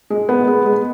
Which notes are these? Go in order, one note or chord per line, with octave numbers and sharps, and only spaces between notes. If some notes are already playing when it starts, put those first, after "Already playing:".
G#3
B3
G#3
G#3